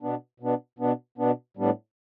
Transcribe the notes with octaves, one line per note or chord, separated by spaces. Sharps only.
B2 B3 D4
B2 B3 D4
B2 B3 D4
B2 B3 D4
A2 G3 B3 D4